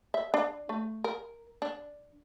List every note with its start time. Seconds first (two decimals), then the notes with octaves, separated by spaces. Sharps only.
0.14 E5
0.34 D4
0.69 A3
1.04 A#4
1.62 D4